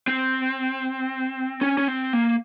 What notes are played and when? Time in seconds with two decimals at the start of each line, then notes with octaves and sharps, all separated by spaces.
0.08 C4
1.61 C#4
1.78 C#4
1.88 C4
2.13 A#3